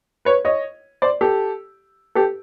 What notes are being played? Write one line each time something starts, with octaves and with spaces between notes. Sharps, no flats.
B4 C#5
C#5 D#5
C5 D5
G4 A4
G4 A4